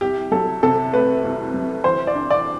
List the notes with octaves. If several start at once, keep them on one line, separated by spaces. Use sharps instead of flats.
C2 G4
F#3 A4
C3 A4
A3 B4
C2
F#3
E3 C5
D5
D4
D5